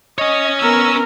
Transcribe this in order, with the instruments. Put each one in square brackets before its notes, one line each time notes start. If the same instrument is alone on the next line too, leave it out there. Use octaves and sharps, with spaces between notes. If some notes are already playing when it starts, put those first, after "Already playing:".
[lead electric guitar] C#4 C#5 [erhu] D#5
[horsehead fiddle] B3 A#4 [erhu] E6